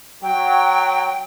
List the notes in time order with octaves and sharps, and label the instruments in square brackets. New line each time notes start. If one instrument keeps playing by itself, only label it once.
[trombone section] F#3 [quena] G5